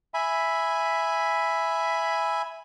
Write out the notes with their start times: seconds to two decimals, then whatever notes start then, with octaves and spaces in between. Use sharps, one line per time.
0.14 E5 G#5 B5